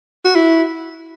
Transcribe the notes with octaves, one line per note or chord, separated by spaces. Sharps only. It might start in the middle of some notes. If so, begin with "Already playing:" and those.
F#4
E4